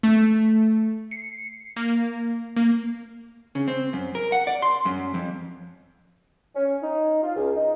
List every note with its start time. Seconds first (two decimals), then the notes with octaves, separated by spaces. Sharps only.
0.03 A3
1.11 C7 C#7
1.76 A#3
2.56 A#3
3.55 C#3
3.68 C4
3.93 F#2
4.15 A#4
4.32 F#5
4.47 D5
4.62 C6
4.85 F#2
5.14 F2
6.55 C#4
6.82 D#4
7.22 F4
7.35 C#2
7.55 D#4